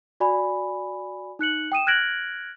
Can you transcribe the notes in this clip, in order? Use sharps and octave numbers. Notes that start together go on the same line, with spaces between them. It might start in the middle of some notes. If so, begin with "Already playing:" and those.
F#4 D5 G#5 B5
D#4 F#6 C#7 F#7
G5 D#6 D#7 E7
F6 F#6 G#6 A#6 D7 F#7